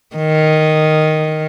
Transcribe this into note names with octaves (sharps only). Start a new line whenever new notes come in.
D#3